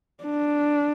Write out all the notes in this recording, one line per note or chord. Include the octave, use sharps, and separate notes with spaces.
D4